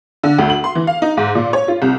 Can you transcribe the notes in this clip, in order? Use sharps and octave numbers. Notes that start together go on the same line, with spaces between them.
D3
D2
F#7
C6
E3
F5
D#4
G#2
A#2
C#5
F4
C2